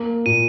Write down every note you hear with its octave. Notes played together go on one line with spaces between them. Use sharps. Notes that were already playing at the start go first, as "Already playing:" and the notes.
Already playing: A#3
A#2 D#7